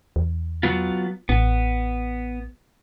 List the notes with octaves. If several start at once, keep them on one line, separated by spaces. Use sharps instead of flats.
E2
F#3 B3 F4
A1 B3